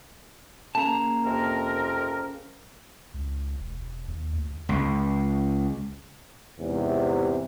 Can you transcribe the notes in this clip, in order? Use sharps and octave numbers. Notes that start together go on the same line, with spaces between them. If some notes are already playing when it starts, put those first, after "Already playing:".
C#3 A#3 A5 A#5
F2 C3 A#4
C#2
E1
D#2
D2
C#2
E2 G#2 C3